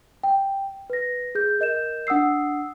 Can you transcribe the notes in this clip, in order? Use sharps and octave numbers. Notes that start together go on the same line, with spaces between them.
G5
B4 A#6
G#4 G6
A#4 D#5 G6 E7
D4 F#5 D#6 E6 C7